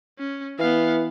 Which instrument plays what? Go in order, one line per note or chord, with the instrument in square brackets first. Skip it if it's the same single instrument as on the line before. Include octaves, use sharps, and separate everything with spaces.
[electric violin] C#4
[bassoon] E3 [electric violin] B3 F5